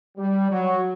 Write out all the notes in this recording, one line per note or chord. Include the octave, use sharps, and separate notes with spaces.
G3
F#3